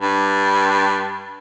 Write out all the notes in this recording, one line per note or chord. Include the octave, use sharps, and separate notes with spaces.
G2